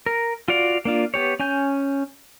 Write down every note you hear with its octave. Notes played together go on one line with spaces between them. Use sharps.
A#4
F4 F#4 D5 F5
A#3 D4 F4
B3 G4 C#5
C#4 G#5 G6